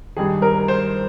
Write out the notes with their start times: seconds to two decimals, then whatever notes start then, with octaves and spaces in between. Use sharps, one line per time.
0.17 G2 D#3 G#3 G#4
0.42 A#4
0.68 C5